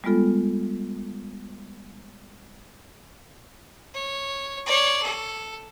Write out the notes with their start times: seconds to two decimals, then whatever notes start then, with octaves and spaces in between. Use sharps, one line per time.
0.04 G3 G#3 B3 F4 A4
3.94 C#5
4.66 C#5 D5
5.02 A4